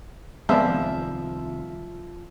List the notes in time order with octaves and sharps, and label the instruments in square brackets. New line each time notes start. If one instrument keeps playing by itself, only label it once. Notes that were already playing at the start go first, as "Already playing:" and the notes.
[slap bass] C2 D#3 C4 [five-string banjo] F3 [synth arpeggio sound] G#3 B3 D5 [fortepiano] E5